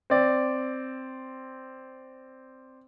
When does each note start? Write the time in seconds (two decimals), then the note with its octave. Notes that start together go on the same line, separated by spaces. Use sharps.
0.10 C4 D5